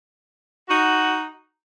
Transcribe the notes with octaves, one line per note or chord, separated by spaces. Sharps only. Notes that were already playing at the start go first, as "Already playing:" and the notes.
D#4 F#4